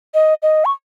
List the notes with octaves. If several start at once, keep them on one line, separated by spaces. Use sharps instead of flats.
D#5
D#5
C#6